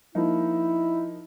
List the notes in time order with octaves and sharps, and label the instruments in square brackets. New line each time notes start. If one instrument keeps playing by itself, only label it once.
[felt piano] F3 A#3 D#4 [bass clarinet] E4